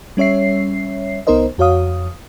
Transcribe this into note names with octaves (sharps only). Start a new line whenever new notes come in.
G3 C#4 C#5 E5 C7
C2 B3 D#4 A#4 C5 D#5
F2 F#4 C#5 F5 D#6